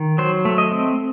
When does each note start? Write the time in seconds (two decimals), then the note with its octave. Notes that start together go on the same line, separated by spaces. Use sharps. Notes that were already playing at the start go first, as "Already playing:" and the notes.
Already playing: D#3
0.18 F#3 C5
0.45 A3
0.58 D#5
0.71 C4